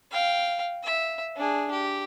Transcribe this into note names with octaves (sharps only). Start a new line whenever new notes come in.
F5 G5
E5
D4 G#4
G4